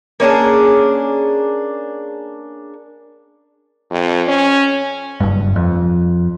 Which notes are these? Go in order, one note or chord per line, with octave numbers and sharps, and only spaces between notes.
A#3 C#4 D4 G#4
F2
C#4
F#1 G2
F2